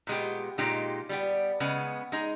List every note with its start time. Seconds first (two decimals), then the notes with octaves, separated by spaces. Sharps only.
0.07 A#2 G#3 B3 G4
0.58 A#2 G#3 D#4 G4
1.09 G3 B3 G4
1.60 C#3 G#3 B3
2.12 G#3 D#4 G#4